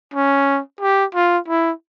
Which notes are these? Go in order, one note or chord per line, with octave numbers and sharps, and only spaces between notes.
C#4
G4
F4
E4